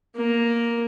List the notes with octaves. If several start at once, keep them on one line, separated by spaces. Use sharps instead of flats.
A#3